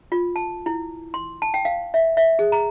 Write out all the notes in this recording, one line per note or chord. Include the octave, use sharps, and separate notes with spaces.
F4
A5
E4
C6
A5
G5
F5
E5
E5
G#4
A#5